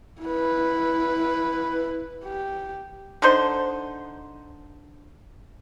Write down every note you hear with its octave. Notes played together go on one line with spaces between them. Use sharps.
E4 B4
G4
D3 D4 D#4 C5